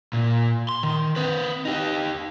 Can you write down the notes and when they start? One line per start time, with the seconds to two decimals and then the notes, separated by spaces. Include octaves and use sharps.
0.13 A#2
0.69 C6
0.83 D#3
1.16 C4 B4
1.65 D#4 G4